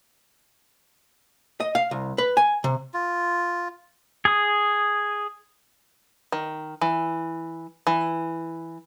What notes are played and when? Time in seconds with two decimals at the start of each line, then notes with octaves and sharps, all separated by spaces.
1.60 D#5
1.75 F5
1.91 C2
2.18 B4
2.37 G#5
2.64 C3
2.94 F4
4.25 G#4 D#6
6.32 D#3
6.81 E3
7.87 E3